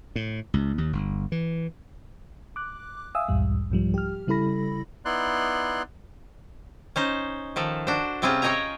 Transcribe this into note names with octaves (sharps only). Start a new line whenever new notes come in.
A2
C#2
D#2
G1
E3
D6 F#6
E5 F5 G#5 D#6 E6
B1 E2 G#2 G3
C2 G#2 F3 G3
G4 F6
C#3 G3 E4 A4 B5 A#6
B3 D#4 E4 D5 C6 F#6
C#4 D#4 C5
D#3 F3 A4
D4 F#4 C5
C3 G3 C4 C#4 F4 G#4
G#4 C#5 D#5 G5 G#5 A#5